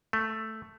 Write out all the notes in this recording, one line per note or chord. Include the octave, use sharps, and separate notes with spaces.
A3